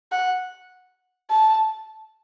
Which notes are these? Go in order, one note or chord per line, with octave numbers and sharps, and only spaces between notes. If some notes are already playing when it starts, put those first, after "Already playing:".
F#5
A5